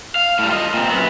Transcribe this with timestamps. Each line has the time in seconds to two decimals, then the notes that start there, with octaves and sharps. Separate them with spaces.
0.15 F5
0.39 A2 G3
0.51 F4 D#5
0.74 A#2 C4
0.90 F#2 B3